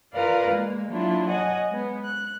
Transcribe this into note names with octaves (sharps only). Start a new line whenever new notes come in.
F4 A#4 B4 D5 F5
G#3 A#3
F#3 A#3 D4 E4 F4
C#5 D#5 F#5 G#5
G#3 B3
F#6